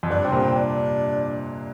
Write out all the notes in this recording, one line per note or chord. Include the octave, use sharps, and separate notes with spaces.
F2
G2 D4
C3 C4
A#2
C4
D4